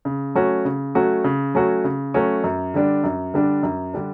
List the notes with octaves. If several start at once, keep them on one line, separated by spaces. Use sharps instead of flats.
C#3
F#3 A3 C#4 F#4
C#3
F#3 A3 C#4 F#4
C#3
F#3 A3 C#4 F#4
C#3
F#3 A3 C#4 F#4
F#2
D3 G3 D4
F#2
D3 G3 D4
F#2
D3 G3 D4